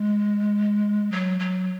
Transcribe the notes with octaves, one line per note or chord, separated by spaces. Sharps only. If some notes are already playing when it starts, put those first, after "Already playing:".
Already playing: G#3
F#3
F#3